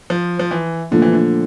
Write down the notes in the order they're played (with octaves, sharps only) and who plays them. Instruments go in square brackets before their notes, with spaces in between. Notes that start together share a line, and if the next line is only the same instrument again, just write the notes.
[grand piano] F3
F3
E3
[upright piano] A#2 F3 A3 [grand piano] D3
[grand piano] E3
D3